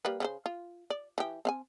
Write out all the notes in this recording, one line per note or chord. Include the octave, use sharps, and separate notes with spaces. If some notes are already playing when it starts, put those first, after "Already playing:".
G3 A#3 B4
C#3 C#4 C5
F4
D5
E3 G4
C4 F5 G#5